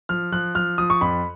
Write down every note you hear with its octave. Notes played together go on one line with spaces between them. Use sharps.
F3 F6
F3 F#6
F3 F6
F3 D#6
C#6
F2 B5